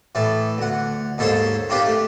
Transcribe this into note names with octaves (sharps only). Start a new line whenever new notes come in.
A2 E3 A4
D2 F#5
D#2 G#2 A4 C5 C#5 C6
D#3 C4 D4 F4 G4
A3